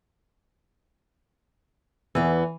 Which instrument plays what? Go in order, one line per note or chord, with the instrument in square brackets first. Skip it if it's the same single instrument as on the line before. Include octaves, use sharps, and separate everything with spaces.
[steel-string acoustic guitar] E2 B3 [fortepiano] E3